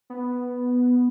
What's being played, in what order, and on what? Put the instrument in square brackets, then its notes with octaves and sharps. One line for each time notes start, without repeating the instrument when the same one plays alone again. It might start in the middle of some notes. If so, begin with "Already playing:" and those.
[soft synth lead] B3